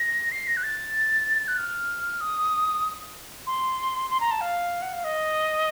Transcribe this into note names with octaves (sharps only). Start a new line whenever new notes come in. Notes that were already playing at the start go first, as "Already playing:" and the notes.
Already playing: A#6
C7
A#6
F#6
A6
F#6
F6
D#6
C6
C6
A#5
A5
F5
F#5
F5
D#5